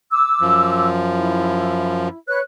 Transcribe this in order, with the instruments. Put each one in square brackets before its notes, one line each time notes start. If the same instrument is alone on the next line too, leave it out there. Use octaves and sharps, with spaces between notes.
[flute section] D6 E6
[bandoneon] F#2 F3
[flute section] E4
B4 C#5 F#6